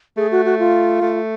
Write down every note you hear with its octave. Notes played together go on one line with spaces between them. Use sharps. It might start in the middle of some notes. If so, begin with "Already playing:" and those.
A3 G#4
F#4
F#4
F4
A3